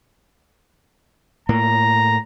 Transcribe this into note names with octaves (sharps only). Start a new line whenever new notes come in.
A2 A#3 A#5